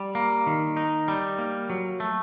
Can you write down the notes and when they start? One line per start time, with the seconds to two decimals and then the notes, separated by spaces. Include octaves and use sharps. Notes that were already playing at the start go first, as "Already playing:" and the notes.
Already playing: G3
0.15 A#3
0.47 D#3
0.77 D#4
1.08 G3
1.38 A#3
1.70 F#3
2.00 A3